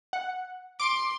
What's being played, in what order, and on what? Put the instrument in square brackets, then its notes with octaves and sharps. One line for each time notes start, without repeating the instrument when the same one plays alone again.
[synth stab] F#5
[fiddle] C6 [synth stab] D6 D7